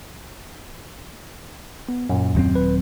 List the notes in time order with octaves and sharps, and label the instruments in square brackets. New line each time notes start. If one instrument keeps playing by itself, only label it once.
[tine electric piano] B3
F#2 A#2
[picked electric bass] D#1 F#3 C4
[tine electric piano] B4